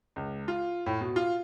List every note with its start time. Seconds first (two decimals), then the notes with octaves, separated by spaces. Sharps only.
0.16 C#2
0.48 F4
0.86 A2
1.01 B2
1.16 F4